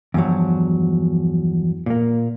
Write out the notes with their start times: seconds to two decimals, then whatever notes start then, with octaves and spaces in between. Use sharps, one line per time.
0.14 E2 G2 F3 F#3
1.86 A#2 A#3